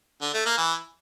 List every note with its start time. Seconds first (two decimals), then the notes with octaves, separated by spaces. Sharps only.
0.22 D3
0.34 A3
0.46 A#3
0.58 E3